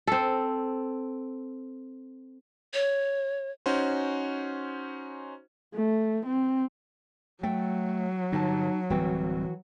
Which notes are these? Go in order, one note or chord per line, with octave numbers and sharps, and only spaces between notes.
C4 A4
C#5
C#4 D#4 F#4 C5
A3
C4
F#3 A3 G5
G2 D3 D#4 G5 A5
D1 E3 G3 C4 F#4 G5